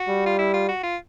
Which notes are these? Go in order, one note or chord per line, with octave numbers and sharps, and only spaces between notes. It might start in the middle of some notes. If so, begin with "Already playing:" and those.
Already playing: F#4
G3
F4
E4
F4
F#4
F4